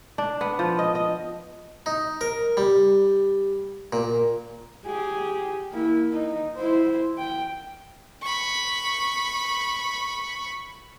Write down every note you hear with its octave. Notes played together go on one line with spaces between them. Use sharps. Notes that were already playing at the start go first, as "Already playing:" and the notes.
D4
B3
F3
D#5
D#5
D#4
A#4
G3
A#2
G4 G#4
A#3 E4
D#4
E4 C5
G5
B5 C#6